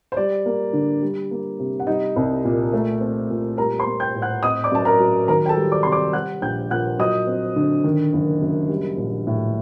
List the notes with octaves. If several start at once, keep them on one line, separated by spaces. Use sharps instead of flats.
C5
G3 D5
A#3
D3
G3
A#3
C3
F#5
G3 D#4 D#5
C2
A#2
A3
C4
A#2
G3 A#4 A#5
C5 C6
A#3
G5 G6
A2
F#5 F#6
C4 D#5 D#6
D5 D6
F#2 A5
A#4 A#5
F#3
D#3 A#4 A#5
G5
A4 A5
G3
D5 D6
C3 C6
D5 D6
G3 F#5 F#6
A#1 G5 G6
A#2 F#5 F#6
F#3 D#5 D#6
C4
D3
D#3
F#1
F#2
G3
A#1
A2